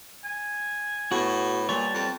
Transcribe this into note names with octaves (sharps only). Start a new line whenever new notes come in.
G#5
A2 B3 F#4
A#2 G3 C#5 A5
F2